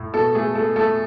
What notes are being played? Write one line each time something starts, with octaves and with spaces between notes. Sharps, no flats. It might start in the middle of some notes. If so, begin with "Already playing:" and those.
Already playing: A2
B2 A4
A3 G#4
A3 A4
A3 A4